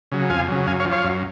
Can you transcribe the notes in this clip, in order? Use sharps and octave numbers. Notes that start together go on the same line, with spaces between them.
C#3 F#3
F2 F5 G#5
C#3 F#3
F#2 F5 G#5
C#5 F5
F3
C#5 F5
F#2